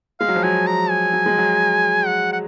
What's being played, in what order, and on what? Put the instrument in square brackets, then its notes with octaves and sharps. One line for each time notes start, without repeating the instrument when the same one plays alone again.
[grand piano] G#3 [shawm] F5
[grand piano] F#3
F3
[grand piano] F#3 [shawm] G#5
[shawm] A#5
G#5
[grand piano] F#3
G#3
F#3
[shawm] F#5
F#5